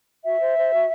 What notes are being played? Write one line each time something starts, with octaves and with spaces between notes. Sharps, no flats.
F#4 E5
C5
C5
F#4